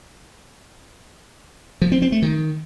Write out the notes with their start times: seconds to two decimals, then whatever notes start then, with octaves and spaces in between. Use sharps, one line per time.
1.82 F3
1.92 C4
2.02 C4
2.12 A3
2.22 D#3